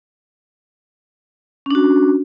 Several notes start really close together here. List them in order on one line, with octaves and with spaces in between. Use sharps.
C#4 D4 F#4